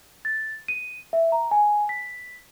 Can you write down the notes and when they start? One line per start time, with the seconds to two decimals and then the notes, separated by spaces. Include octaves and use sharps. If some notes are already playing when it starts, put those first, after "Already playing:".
0.25 A6
0.68 D#7
1.13 E5
1.32 A#5
1.51 G#5
1.89 B6